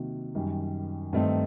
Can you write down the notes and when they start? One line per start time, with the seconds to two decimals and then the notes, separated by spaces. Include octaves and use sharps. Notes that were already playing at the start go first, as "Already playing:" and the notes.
Already playing: C3 D#3 F#3 A#3 F#4
0.35 F#2 D#3 G3
1.13 G2 D#3 A3 C4 D#4